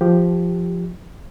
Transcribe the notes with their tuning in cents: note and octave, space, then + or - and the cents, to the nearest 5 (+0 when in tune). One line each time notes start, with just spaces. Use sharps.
F3 +0 G4 +0